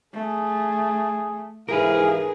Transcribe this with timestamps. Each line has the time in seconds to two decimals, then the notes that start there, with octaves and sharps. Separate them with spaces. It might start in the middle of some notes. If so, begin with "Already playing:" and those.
0.13 A3 G#4
1.69 G#2 C3 E3 D#4 G#4 A#4 B4 F5